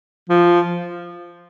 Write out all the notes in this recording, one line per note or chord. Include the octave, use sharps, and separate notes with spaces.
F3